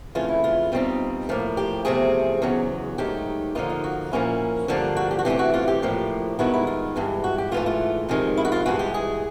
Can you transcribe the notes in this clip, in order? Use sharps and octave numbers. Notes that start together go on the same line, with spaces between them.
F2 C#3 E3 A3 F4
E4
F4
B2 G3 C4 D#4
A2 F3 A#3
G4
E2 C3 F3 A3 C4 G#4
E2 C#3 F#3
G#2 D#3 F#3 A3 G4
D3 F3 A#3 D#4 F4
F4
F#4
A#2 F3 A#3 C#4 E4
G2 D3 F3 A#3 D4
F#4
G4
F#4
C3 E3 A3 C4 G4
F#4
F4
G4
A2 F3 A#3 D4
G2 D#3 G#3 B3 E4 F#4
E4
F4
G2 E3 G#3
F#4
G4
G#2 E3 A3 F4
F4
F2 C3 D#3 G#3
E4
F#4
F4
G2 E3 G#3 F#4
G4
G#4